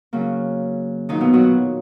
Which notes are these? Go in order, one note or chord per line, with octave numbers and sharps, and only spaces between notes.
C#3 F#3 A#3
A#2 D#3 F#3 D#4
B2 B3
F#3 F#4